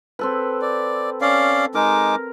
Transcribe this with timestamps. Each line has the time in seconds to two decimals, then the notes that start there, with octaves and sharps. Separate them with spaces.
0.19 C4 A4 B4
0.61 D5
1.21 C#4 D5 F5
1.75 G#3 D#4 A#4 D6